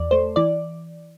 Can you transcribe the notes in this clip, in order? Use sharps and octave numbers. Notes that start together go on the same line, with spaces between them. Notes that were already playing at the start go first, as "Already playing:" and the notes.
Already playing: E2 D5
A3 C5
E3 D5